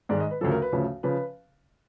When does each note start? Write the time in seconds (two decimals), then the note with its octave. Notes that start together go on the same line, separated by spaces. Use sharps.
0.09 G#2 D#3 G#3 D5
0.20 D#5
0.31 B4
0.41 D2 C#3 F3 A4
0.52 A#4
0.62 B4
0.72 D2 C#3 F3
1.03 C#3 F3 B4